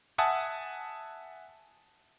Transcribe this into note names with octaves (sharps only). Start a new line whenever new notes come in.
E5 F#5 G#5 A5 D#6